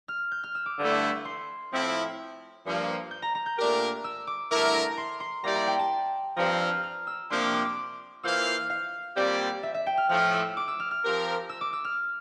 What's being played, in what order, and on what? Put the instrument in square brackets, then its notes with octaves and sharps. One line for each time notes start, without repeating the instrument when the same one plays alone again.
[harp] F6
G6
F6
E6
D6
[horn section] G2 D3 A3 E4
[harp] C6
[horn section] A2 F3 C4 E4
G2 F3 A#3
[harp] G6
A#5
A#5
G6
[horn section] A#2 A3 D4 G4 A#4
[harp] E6
D6
[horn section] G2 D3 A3 E4 A#4 [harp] D6
[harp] A#5
C6
C6
[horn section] G3 A#3 E4 G4 D5 [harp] A#5
[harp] A#5
G5
A5
[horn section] G2 F3 C4 [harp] A#5
[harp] F6
F6
E6
[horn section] C3 F3 A#3 D4 G4 [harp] C6
[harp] D6
D6
D6
[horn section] E3 A#3 F4 C5 F5 [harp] E6
[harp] G6
F6
F5
[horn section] A#2 G3 C4 G4 D5
[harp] E5
E5
G5
F6
[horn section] A2 F3 A3 [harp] F6
[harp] E6
D6
E6
F6
F6
[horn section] F3 C4 G4 A#4
[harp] E6
D6
E6
F6